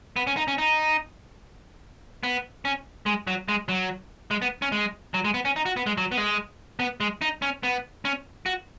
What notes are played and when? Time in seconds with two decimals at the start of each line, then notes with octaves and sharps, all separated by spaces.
0.16 B3
0.27 C#4
0.37 D#4
0.48 C#4
0.58 D#4
2.23 B3
2.65 C#4
3.06 G#3
3.27 F#3
3.49 G#3
3.69 F#3
4.31 G#3
4.42 B3
4.62 C#4
4.72 G#3
5.14 F#3
5.25 G#3
5.34 B3
5.45 C#4
5.56 D#4
5.66 F#4
5.76 B3
5.87 G#3
5.98 F#3
6.12 B3
6.17 G#3
6.80 B3
7.00 G#3
7.21 D#4
7.42 C#4
7.63 B3
8.05 C#4
8.46 F#4